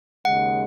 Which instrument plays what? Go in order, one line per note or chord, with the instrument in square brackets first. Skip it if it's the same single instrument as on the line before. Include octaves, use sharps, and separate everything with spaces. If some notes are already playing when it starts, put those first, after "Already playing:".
[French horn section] D#2 C#3 G#3 [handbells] F#5